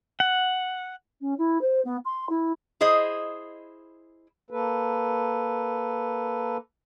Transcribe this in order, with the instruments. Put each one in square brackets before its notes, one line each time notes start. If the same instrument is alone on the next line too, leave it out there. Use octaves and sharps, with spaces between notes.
[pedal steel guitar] F#5
[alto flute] C#4
E4
C5
B3
C6
E4
[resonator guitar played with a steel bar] E4 G#4 C5 D#5
[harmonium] A#3 A4 B4